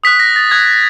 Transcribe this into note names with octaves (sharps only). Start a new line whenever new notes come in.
D#6 F#6 B6
A#6
A6
D#6 F#6 G#6